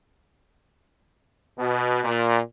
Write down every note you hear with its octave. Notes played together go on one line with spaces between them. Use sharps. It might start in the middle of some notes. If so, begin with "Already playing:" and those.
B2
A#2